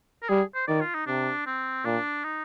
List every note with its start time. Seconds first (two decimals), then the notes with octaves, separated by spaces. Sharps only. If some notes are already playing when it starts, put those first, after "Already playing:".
0.23 A#4
0.29 G3 G#4
0.55 C5
0.68 D#3 D5
0.81 F4
0.94 D#4
1.07 C3 D4
1.46 C4
1.85 A#2 D4
2.24 D#4